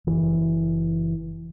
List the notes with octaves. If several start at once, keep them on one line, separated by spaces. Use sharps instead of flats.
F#1 E3